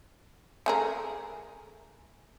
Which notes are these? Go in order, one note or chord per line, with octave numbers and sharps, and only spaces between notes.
A3 G#4 A#4